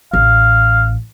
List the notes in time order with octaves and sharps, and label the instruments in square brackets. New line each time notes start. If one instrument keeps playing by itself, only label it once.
[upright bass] A1 [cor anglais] F5